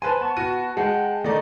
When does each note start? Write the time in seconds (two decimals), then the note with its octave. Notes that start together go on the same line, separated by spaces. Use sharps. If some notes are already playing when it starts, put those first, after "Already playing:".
0.02 B4 C5 G#5 A5 C6
0.21 B3 A5 C#6
0.37 F#4 D#7
0.77 G#3 F#5 G5 A5
1.24 D#3 A3 D#4 D5 D#5